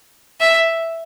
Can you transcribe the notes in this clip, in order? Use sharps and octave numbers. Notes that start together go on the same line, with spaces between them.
E5